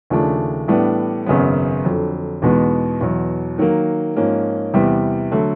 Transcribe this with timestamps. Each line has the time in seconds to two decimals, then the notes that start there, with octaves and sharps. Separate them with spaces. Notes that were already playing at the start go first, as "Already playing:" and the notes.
0.10 D#2 C#3 F3 A3 D4
0.68 A2 E3 G3 B3 D4
1.26 G#1 F#2 C#3 F#3 B3
1.84 F2 D3 F#3
2.42 E2 B2 G#3 B3 D#4
3.00 E2 B2 F#3
3.58 D#3 F#3 A#3
4.16 G#2 F3 A#3 C#4
4.74 E2 C3 E3 G3 B3
5.32 D3 F#3 A3